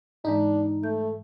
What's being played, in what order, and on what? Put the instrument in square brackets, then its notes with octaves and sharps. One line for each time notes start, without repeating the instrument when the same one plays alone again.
[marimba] G#2 E3 G#3 [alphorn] D4 [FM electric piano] D#4
[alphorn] A3 [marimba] G6